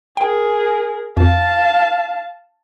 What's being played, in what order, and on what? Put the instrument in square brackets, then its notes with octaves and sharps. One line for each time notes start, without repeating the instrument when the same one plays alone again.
[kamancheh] G#4 A#4 [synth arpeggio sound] G5
[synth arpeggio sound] F2 [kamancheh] F5 A5